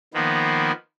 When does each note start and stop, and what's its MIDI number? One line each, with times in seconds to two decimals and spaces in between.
0.14 0.72 51
0.14 0.72 53
0.14 0.72 58
0.14 0.72 59